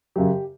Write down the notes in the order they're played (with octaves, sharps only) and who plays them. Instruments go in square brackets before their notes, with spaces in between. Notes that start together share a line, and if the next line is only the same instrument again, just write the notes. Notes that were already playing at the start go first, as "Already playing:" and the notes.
[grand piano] F#2 C#3 F#3 G4